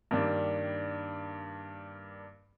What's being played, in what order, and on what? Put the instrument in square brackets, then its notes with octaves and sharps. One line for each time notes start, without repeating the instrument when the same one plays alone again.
[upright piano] G2 D#3 G3 A#3 D4